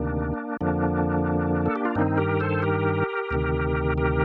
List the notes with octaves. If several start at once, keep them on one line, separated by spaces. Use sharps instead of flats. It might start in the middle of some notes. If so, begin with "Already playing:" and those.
Already playing: D2 C3 D#3 A#3 D4
F2 D3 F3 A#3 D4
A4
G4
F4
G2 D#3 C4 D#4
G4 A#4
A4 C5
G4 A#4
D2 C3 D#3
G4 A#4